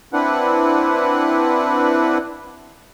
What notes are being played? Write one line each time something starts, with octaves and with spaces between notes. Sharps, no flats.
C4 D4 E4 B4 F#5